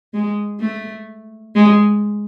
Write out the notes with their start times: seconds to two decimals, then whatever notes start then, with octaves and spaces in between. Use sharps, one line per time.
0.14 G#3
0.60 A3
1.55 G#3